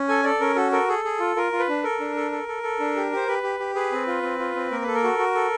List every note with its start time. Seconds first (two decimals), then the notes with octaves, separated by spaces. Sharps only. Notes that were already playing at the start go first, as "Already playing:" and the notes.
Already playing: C#4
0.08 A4 G#5
0.24 A4 D5
0.40 C#4 A#4
0.56 F#4 A4
0.72 A4 A#4
0.88 G#4 A4
1.05 G#4
1.20 F4
1.36 F4 A#4
1.52 F4
1.59 B4
1.69 D4
1.84 A4 A#4
2.00 D4
2.16 A4
2.32 A4
2.48 A4
2.63 A4
2.80 D4
2.96 G4
3.12 G4 C5
3.27 G4 B4
3.43 G4
3.60 G4
3.75 G#4 B4
3.92 C4
4.07 F4
4.23 C4
4.39 F4
4.55 C4
4.71 A#3 A#4
4.83 A4 B4
4.94 A#4
5.04 F#4
5.18 F#4
5.34 A4